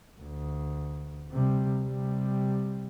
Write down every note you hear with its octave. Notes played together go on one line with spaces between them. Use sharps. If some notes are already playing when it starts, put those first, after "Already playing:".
D2
C3 G3
C3 G3